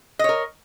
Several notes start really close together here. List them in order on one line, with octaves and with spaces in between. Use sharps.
D#5 C#5 A#4